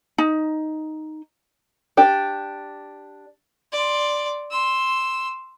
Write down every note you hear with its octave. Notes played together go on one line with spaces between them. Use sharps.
D#4
D4 G4
D5 C6
C6 E6